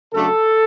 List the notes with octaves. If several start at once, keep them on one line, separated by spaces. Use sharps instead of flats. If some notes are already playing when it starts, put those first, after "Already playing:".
C#3 F#3 A3 D4 A4